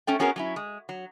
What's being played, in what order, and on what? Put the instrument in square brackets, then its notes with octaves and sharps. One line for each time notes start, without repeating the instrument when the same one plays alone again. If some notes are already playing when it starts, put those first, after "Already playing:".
[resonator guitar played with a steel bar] A3 C#4 A4 G5
B3 C#4 F#4 G#4 A#4
F#3 C#4 E4
G#3
F#3